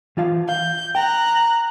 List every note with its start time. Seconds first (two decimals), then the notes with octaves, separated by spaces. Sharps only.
0.17 E3 F4 F5
0.49 F5 G6
0.95 G5 A#5 F#6